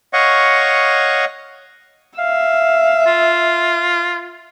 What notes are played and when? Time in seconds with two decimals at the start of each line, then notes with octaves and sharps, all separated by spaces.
0.13 C#5 D#5 F5 F#5 C#6
2.18 E5 F5
3.06 F4